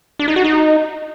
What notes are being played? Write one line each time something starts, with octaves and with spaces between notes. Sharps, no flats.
D4
D#4
F#4
D#4